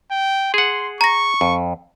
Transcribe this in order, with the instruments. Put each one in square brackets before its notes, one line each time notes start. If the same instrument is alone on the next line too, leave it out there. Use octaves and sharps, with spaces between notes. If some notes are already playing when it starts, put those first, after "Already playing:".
[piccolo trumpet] G5
[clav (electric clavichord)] G#4 F#5 [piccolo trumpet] C6
[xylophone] A#5 A#6 [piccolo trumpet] C#6
[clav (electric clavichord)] F2